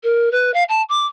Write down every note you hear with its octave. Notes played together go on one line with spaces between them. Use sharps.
A#4
B4
F5
A5
D6